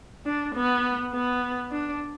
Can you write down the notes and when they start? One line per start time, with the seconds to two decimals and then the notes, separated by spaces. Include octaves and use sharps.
0.26 D4
0.55 B3
1.13 B3
1.71 D4